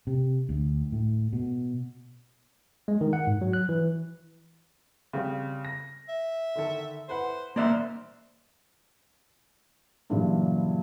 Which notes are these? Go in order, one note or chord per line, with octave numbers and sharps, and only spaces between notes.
C3
D2
A2
B2
G#3
D#3
F#5
G#2
F#3
F#6
E3
C#3 G3 C4
A#6
E5
D3 D#3 A4
E4 B4 C5 F#5
A#3 C5 D5 E5
G2 A#2 C#3 E3 F#3